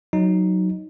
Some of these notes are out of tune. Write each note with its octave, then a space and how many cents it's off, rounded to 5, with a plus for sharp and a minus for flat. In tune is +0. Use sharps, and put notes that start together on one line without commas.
F#3 +0 D#4 +0